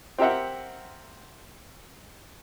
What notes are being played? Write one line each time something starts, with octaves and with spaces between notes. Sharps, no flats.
C4 G4 A#4 E5 F#5